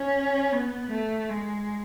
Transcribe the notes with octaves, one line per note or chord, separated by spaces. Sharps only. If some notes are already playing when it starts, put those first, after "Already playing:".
Already playing: C#4
B3
A3
G#3